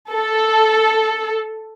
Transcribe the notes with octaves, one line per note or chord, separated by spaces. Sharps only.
A4